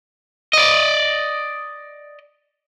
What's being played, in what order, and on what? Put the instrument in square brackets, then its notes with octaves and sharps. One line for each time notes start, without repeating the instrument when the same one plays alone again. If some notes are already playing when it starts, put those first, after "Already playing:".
[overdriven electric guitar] D5 D#5